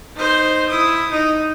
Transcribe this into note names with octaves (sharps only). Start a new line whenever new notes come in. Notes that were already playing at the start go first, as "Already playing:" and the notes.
D#4 C5
E4 D#6
D#4